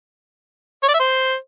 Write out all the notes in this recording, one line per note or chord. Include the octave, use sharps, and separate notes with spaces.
C#5
D5
E5
C5